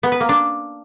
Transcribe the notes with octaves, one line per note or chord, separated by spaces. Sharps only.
B3
B4
A#3
D4